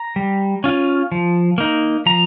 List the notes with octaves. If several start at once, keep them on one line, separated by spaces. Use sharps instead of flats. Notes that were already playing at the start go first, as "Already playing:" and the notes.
Already playing: A#5
G3
C#4 F4
F3
A#3 D#4
F3 A#5